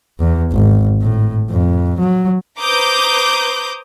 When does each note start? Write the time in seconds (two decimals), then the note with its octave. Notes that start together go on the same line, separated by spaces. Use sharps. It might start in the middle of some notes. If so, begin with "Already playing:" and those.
0.20 E2
0.52 G#1
1.02 A2
1.50 F2
1.99 F#3
2.60 B4 C5 A#5 D6 D#6 G6